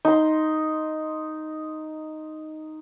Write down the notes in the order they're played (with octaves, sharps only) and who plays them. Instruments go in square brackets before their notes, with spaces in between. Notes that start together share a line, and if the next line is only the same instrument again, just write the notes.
[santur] D#4 C6